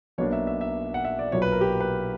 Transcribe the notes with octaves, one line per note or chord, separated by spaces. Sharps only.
B1 B2 F#3 A#3 D4 C#5
E5
E5
E5
F#5
E5
D5
B1 A#2 F#3 C#5
B4
A#4
G4
B4